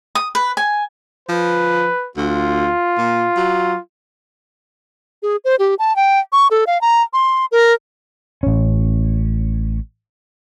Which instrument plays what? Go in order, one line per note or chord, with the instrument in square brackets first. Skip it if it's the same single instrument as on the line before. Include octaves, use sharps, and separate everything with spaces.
[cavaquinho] D#6
B4
G#5
[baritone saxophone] F3 [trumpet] B4
[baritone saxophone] D2 [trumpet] F4
[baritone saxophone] A#2
F#3
[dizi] G#4
C5
G4
A5
G5
C#6
A4
F5
A#5
C6
A#4
[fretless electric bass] A1 C#4